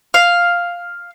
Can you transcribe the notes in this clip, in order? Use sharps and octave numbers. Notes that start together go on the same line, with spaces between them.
F5